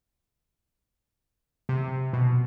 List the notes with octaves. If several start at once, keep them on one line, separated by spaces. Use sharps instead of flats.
C3
B2